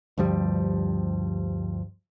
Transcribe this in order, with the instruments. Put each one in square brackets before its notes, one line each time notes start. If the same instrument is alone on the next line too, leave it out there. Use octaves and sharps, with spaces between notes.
[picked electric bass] D2 G2 F3 G3